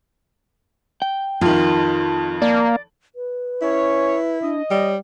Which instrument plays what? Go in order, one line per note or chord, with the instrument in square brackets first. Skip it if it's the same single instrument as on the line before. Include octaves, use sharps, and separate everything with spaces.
[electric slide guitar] G5
[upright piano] F2 D#3 [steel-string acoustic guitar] F4
[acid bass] A#3 [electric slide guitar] D5
[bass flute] B4
[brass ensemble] C#4 C#5 [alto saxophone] E4
[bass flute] D4 [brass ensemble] D#5
[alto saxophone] G3 [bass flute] C#5